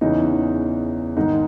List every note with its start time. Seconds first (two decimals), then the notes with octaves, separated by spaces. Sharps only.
0.01 E2 C#3 E3 D#4
1.17 G#2 D#3 G#3 D#4